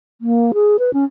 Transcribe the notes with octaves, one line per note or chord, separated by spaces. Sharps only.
A#3
G#4
B4
C#4